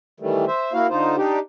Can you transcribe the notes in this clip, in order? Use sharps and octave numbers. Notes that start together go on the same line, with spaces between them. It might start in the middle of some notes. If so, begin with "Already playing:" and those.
D#3 E3 G3 A3
C5 E5
A#3 E4 F#4 F5
D3 D#4 F4 C5
D4 D#4 G4